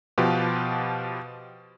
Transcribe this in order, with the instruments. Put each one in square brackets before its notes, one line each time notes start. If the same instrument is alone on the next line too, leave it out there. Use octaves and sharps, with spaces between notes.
[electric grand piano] B2 F3 F4 G4 B4